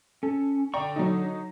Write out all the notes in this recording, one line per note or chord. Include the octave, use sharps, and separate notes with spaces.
C#4 A4
D3 D5 G5 A#5 C#6
F#3 D#4